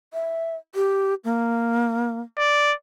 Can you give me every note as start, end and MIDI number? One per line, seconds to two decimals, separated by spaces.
0.13 0.56 76
0.75 1.14 67
1.24 2.20 58
2.38 2.74 74